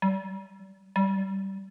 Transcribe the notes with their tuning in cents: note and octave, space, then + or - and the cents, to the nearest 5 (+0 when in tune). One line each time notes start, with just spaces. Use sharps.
G3 -35
G3 -20